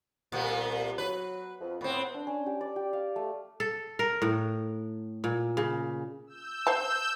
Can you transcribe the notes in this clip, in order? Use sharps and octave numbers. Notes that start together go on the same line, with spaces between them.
C2 A#2 B3
F#3 B4
F2
A2 B3 C4 B4 F#5
D4
C#4
G4
D5
G4
F5
A3
A4
A#4
A2
A#2
C#3
E6 G6
C5 F5 A5